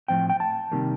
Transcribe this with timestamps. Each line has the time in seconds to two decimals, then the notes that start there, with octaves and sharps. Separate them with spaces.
0.08 A2 F3 C4 G5
0.30 G5
0.40 A5
0.71 C3 D#3 G3 A#3